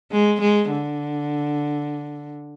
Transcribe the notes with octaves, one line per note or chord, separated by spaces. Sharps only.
G#3
G#3
D3